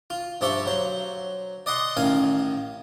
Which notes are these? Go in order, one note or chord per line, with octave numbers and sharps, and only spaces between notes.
F4
G2 F3 G4 C5 E5 C#6
F#3 C5
D5 D#5 F#5 C6
A1 D#3 F5 G#5